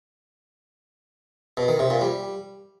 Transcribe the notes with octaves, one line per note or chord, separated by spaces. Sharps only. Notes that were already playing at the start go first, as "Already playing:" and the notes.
B2
D#3
C3
A#2
G3